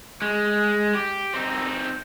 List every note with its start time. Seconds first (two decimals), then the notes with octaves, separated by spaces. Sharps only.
0.22 G#3
0.95 G4
1.34 C4 D#4